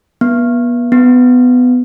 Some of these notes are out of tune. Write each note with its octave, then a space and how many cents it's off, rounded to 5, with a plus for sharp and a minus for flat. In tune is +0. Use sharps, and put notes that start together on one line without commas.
B3 -35
B3 +15